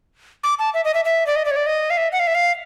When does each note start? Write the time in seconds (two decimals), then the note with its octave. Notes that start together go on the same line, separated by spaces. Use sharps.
0.44 D6
0.59 A5
0.74 E5
0.85 D#5
0.94 E5
1.05 E5
1.27 D5
1.36 D#5
1.45 D5
1.51 C#5
1.56 D5
1.66 D#5
1.90 F5
1.97 E5
2.12 F#5
2.20 F5
2.27 E5
2.35 F5